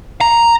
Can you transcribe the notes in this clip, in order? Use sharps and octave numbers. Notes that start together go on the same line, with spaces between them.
A#5